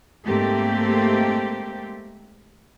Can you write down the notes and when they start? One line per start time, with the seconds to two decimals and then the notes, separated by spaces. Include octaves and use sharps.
0.25 G#2 A3 A#3 C4 G4